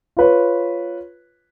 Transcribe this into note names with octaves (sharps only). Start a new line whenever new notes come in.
F4 B4 C#5